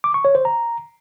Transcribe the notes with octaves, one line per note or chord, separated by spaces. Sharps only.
D6
C#6
C#5
C5
A#5